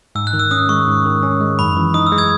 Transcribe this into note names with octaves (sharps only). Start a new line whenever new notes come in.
G#2 E6
F#6
D#3
E6
C#4 D#6
G#3 C#6
G#2
D#3
C#4
G#3
F#2 B5
E3
D#4 D#6
E6
G#3
E6 G#6